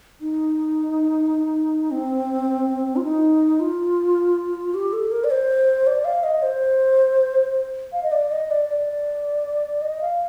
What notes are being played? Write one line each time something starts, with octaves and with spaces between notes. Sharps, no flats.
D#4
C4
F4
D#4
F4
G4
A4
A#4
D5
C5
D5
F5
D#5
C5
F5
D#5
D5
D#5
D5
D5
D#5
F5